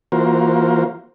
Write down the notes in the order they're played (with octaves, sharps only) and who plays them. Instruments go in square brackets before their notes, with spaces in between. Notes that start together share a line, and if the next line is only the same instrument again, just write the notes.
[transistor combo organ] E3 A#3 F4 F#4 A#4 C5